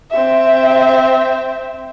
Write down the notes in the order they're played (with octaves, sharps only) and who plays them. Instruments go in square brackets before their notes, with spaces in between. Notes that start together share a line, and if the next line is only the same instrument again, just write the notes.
[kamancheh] C4 E5